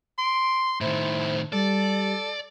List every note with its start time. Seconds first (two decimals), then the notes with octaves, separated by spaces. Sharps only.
0.18 C6 D7
0.81 A2 D#3 E4 C5
1.53 G3 A4 D5